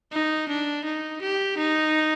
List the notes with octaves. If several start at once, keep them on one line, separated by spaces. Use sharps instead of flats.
D#4
D4
D#4
G4
D#4